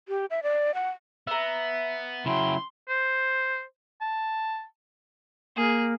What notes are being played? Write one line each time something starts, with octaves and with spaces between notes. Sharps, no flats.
G4
E5
D5
F#5
B3 E5 A#5
C#3 F#3 E4 G5 C6
C5
A5
A#3 G#4